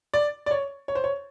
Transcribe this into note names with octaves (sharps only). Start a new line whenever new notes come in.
D5
D5
C#5
C#5
C5
C#5